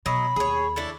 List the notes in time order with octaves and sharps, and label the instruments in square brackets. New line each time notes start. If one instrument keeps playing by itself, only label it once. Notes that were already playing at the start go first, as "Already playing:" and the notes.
[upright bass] B2 [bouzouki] F#3 D#5 [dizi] B5
[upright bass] D#2 [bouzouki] G#4 C#5
[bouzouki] D4 E4 A4